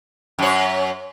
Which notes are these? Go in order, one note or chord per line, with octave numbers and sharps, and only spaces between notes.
F#2 C#5